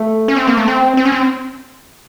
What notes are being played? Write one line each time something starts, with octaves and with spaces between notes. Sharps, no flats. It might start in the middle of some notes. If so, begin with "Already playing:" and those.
Already playing: A3
C#4
C4
A#3
A3
C4
C4
C#4
C4